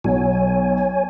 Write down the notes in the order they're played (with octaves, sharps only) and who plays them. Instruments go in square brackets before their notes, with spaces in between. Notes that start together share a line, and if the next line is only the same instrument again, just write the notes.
[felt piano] B1 F#3 [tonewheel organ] C#5 G#5